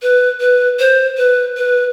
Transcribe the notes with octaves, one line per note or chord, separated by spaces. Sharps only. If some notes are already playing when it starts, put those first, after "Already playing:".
B4
B4
C5
B4
B4